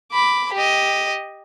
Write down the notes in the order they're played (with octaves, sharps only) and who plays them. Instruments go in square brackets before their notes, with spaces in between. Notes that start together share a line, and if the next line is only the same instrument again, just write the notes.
[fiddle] B5 D6
G4 D#5